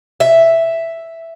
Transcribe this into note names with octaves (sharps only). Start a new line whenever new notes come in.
E5